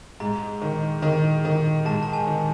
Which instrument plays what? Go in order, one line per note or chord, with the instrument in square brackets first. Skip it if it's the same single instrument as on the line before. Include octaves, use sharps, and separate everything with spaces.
[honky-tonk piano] G#2 [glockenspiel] A#5
[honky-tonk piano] D#3
D#3
D#3
[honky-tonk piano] G#2 [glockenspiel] A5
[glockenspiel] A5
G#5
[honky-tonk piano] D#3